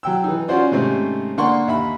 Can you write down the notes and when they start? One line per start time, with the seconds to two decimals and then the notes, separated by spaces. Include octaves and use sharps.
0.03 F#3 G5 E6
0.24 E3 D#4
0.48 C#4 F4 F#4 C5 D5
0.72 G#2 C3 D#3 A3 C4 C#4
1.38 D3 A#3 D5 F#5 C6 C#6
1.68 D#2 E5 B5